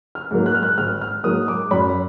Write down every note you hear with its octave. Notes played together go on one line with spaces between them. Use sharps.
F6
G#2 F#3 A#3
F#6
F6
F#6
G#1 F6
F6
G#2 F#3 A#3 D#6
D6
F#2 B5